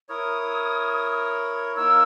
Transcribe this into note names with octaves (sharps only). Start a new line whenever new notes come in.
E4 A#4 C#5 D#6
A#3 D#4 A#4 C#5 E6